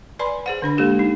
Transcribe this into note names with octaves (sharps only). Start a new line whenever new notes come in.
B4 D5 G#5 B5 C6
G#4 C5 F#5
D3 D4 B5
G#3 A#3 G4 A4
D#4